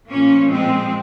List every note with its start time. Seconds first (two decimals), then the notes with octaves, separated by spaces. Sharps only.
0.11 A#2 F3 A#3 C#4
0.51 G#3 C4